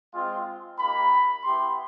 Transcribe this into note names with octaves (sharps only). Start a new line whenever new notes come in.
G#3 C4 F4
A#3 D#4 G4 B5
B3 E4 G4 C6